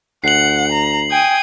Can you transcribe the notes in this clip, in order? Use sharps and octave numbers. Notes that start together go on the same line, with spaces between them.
D2 F#5 C7 F#7
A#5
G5 G#5 D#6